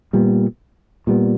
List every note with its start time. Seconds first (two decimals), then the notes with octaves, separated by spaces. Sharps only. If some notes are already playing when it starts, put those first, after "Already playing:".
0.13 A#2 G3 B3
1.07 A#2 G3 B3